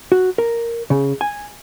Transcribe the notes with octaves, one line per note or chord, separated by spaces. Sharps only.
F#4
A#4
C#3
G#5